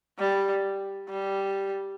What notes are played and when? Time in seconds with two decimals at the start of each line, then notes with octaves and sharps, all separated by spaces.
0.19 G3
1.09 G3